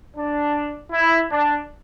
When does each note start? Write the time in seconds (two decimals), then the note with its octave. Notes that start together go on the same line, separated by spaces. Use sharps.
0.17 D4
0.92 E4
1.30 D4